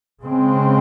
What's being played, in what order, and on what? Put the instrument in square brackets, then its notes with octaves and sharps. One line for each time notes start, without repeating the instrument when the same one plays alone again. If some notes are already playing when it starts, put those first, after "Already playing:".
[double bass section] C#3 G#3 C4